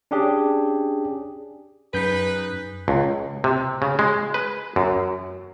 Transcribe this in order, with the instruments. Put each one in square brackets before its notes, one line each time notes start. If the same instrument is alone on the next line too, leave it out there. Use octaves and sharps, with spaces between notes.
[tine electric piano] C#4 D4 G4 G#4
[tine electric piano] F#2 G6 B6 [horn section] D#4 G#4 B4
[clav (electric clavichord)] C#2
C3
C#3
G#3
B4
F#2